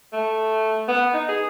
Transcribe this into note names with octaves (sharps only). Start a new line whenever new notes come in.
A3
B3
D#4
G#4